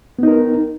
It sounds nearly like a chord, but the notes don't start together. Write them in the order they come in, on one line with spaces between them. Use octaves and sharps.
B3 D#4 A#4